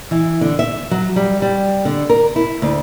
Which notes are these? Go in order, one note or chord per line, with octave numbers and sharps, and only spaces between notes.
E3
D3
E5
F#3
G3
G3
D3
A#4
E4
D2